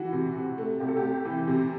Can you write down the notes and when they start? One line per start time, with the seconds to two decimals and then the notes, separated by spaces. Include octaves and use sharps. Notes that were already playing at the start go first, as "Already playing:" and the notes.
Already playing: E3 F#4
0.13 C3
0.35 C3
0.58 A3
0.80 C3 G4
0.88 A4
0.97 G4
1.03 C3
1.25 E3
1.48 C3